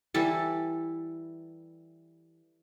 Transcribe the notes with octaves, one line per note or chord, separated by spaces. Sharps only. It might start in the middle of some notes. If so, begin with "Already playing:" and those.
E3 G3 A4